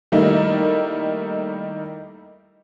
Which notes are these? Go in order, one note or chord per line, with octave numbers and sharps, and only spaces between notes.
D#3 G3 A3 A#3 D#4 E4